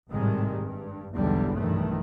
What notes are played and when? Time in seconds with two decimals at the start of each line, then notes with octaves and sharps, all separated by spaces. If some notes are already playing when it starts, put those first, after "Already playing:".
0.11 G#1 A2 C3 D#3 G3 G#3
0.60 G2
1.16 B1 E2 G#2 D3 E3 G3
1.57 B1 G2 D#3 E3 A3